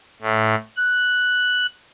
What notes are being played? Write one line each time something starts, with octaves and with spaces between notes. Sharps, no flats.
A2
F#6